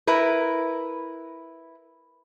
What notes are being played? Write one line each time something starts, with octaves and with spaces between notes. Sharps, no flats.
E4 A#4 B4